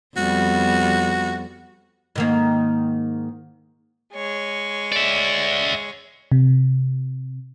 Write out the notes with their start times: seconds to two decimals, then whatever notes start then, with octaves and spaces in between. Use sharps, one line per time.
0.16 F2 G3 B3 F#4
2.16 G#2 D#3 A#3
4.14 G#3 C#5
4.92 D5 E5
6.32 C3